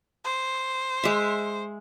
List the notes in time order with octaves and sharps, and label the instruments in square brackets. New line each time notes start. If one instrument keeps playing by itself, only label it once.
[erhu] C5
[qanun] G#3 E5